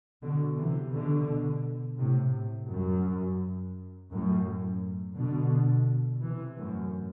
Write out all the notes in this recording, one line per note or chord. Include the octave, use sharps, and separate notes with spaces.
B2 D3
C3 E3
B2 D3
A2 C3
F#2
F#2 A2
B2 D3
C3 E3
F#2 A2